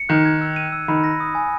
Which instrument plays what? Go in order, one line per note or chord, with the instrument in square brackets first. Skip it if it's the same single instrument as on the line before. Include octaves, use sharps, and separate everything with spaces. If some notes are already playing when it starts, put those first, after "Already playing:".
Already playing: [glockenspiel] C#7
[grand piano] D#3 [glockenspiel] F#6
[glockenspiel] G#6
E6
D#7
E6
[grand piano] D#3 [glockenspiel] B5
[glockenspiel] A#6
D#6
G#5